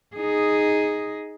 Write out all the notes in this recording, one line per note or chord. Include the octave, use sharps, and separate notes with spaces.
D#4 G#4